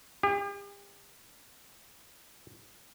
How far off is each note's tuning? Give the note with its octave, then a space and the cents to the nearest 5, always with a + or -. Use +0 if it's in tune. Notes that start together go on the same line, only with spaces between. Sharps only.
G4 +40